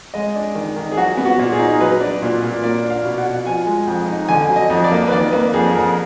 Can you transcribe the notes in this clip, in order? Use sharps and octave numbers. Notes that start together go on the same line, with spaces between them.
G#3 D#5
D4
D#3
D#3
G#4
F#3 F#4
B3
F#4
A#2
G#4
D#4
F#3 B4
D4
A#2
A#2
A#3 D5
D4
F5
B2
F#5
B2
F3 G#5
G#3
F2
D#4
D3 G#5
F#3
D#5
F2
D5
A#3
B4
D#3 D5
A#3 B4
F2 G#4
F2 A#4